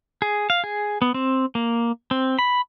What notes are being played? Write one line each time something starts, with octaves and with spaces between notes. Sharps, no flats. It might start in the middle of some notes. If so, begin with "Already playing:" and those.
G#4
F5
G#4
B3
C4
A#3
C4
B5